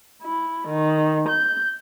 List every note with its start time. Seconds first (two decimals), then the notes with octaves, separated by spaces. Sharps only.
0.23 E4
0.67 D#3
1.29 G6